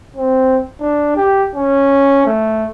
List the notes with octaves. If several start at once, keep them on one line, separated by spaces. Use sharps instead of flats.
C4
D4
G4
C#4
A3